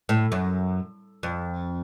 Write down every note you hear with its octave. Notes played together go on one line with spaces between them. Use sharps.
A2
F#2
F2